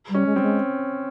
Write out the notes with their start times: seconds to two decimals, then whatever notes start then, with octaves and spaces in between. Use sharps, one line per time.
0.09 G3
0.14 C#4
0.26 G#3
0.36 G3 C4
0.42 G#3